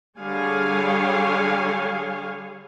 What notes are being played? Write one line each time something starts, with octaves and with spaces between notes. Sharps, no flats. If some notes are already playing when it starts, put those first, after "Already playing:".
D3 G3 G#4 C#5 F5 G#5